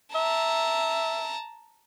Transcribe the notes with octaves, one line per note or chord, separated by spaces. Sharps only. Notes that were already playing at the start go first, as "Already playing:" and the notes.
E5 A5 A#5